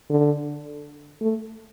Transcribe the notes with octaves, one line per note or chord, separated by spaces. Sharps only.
D3
A3